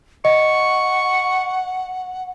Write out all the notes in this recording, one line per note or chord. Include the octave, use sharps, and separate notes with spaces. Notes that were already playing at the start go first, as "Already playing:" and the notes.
D#5 F#5 C#6